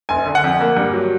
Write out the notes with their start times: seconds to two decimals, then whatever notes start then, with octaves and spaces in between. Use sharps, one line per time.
0.09 F#1 G#5
0.26 D3
0.35 F#5
0.44 F2
0.61 A#3
0.77 G2
0.93 F#3